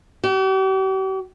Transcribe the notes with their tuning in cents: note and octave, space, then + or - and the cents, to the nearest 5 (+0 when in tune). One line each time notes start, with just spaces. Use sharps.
G4 -45